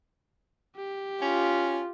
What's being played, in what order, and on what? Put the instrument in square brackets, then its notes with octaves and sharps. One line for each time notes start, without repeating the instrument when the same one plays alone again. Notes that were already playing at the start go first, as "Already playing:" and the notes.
[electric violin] G4
[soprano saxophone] C#4 [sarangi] F4